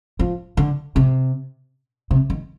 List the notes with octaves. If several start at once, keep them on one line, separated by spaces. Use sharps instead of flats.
F3
D3
C3
C3
D#3